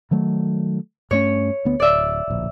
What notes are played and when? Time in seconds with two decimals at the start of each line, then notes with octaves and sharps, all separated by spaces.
0.11 D#3 F#3 A3
1.11 G2 A3 C#4 C#5
1.65 D2 B3
1.80 D1 D5 E5
2.28 D1 A#1